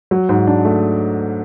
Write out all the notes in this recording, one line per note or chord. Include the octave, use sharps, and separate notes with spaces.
F#3
G#2
D4
A3